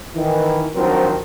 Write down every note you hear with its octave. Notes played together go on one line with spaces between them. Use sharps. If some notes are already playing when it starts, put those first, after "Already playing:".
D#3 E3
D#3 F3 F#3 C4 D4 A#4